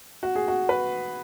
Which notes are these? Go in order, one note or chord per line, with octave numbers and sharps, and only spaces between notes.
F#4
G#4
F#4
B4